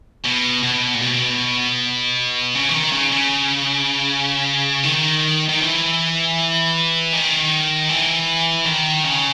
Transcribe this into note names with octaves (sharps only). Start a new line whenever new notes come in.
B2
B2
A#2
B2
C#3
E3
D#3
C#3
C#3
D#3
D#3
E3
D#3
E3
D#3
C#3